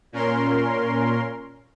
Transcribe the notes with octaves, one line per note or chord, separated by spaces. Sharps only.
A#2 C#4 A#4 C6